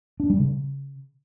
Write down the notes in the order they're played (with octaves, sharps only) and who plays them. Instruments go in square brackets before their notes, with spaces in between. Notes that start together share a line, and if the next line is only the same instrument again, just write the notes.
[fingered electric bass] D4
G3
C#3